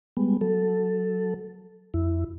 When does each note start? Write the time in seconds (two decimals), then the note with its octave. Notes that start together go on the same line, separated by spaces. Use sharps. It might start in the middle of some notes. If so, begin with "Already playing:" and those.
0.17 G3 G#3 B3
0.41 F#3 A4
1.94 F2 E4